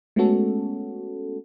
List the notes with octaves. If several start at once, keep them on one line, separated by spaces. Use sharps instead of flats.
G#3 A3 B3 C#4 F#4 A4